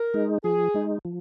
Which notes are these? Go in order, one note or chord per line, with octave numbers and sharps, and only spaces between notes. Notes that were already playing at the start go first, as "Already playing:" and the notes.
Already playing: A#4
G#3 D#4
F3 G#4
G#3 D#4
F3